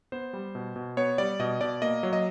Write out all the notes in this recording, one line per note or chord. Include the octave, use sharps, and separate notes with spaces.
B3 C5
G3
B2
B2
B3 C#5
G3 D5
B2 D#5
B2 D5
A#3 D#5
F#3
D#5